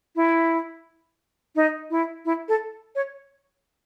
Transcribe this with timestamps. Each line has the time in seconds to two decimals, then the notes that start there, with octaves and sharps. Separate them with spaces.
0.16 E4
1.55 D#4
1.90 E4
2.25 E4
2.48 A4
2.95 C#5